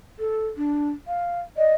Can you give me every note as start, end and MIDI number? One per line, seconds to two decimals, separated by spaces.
0.19 0.47 69
0.57 0.90 62
1.07 1.40 77
1.57 1.72 74
1.57 1.75 75